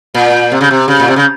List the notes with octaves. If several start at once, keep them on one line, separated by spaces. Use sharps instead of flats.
A#2
C3
C#3
C3
C#3
A#2
C3
C#3